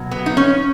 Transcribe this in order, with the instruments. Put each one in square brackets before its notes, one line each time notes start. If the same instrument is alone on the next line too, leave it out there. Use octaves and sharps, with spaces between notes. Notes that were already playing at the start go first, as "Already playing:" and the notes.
Already playing: [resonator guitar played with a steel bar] B2 F#3
B3
D#4
C#4